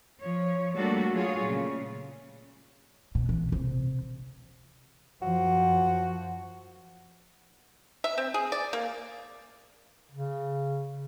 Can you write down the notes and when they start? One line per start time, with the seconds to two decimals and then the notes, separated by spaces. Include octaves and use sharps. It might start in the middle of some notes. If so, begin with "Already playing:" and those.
0.22 F3 C#5
0.74 G3 A3 A#3 D4 F#4 A4
1.13 F#3 F4 G#4 C#5
1.44 A#2 C#3 A3
3.15 B2
3.29 E3
3.52 C3
5.22 F#2 F3 F#4
8.04 E5
8.18 C4
8.34 G#4
8.52 D5
8.73 A#3
10.11 C#3